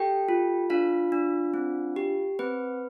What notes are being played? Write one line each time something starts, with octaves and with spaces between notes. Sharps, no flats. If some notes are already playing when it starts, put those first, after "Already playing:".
Already playing: G4 A4 G5
F4
D4 F4 F5
D4
C4
G4
C4 B4